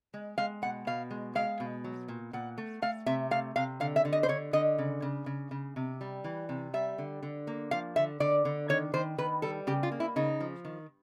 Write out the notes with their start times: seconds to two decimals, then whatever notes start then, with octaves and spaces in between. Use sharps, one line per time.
0.14 G#3
0.38 G#3 F5
0.62 B2 F#5
0.87 B2 F5
1.11 G#3
1.35 G#3 F5
1.60 B2
1.84 F#3
2.08 A#2
2.33 A#2 F#5
2.58 A3
2.82 A3 F5
3.06 C3 E5
3.31 A3 F5
3.56 C3 F5
3.80 D3 F5
3.96 E5
4.05 D3
4.13 D#5
4.23 C5
4.28 D3 C#5
4.53 D3 D#5
4.78 C#3
5.02 C#3
5.26 C#3
5.51 C#3
5.76 C3
6.01 G3
6.24 E3
6.49 C3
6.74 G3 E5
6.98 D3
7.23 D3
7.47 A#3
7.71 F3 F5
7.96 D3 E5
8.20 D3 D5
8.45 D3
8.69 D#3 C#5
8.93 D#3 C5
9.18 D#3 B4
9.42 G3 A4
9.67 C#3 G4
9.83 F4
9.92 A#3
10.00 E4
10.16 C#3 D#4
10.40 F3
10.65 D#3